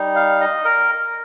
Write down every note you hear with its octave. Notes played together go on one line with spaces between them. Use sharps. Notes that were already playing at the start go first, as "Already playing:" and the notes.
Already playing: G3 D#4
F5
D#5
A#4